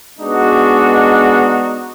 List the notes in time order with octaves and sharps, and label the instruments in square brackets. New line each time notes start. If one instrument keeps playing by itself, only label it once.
[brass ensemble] G#3 B3 D4 D#4 F#4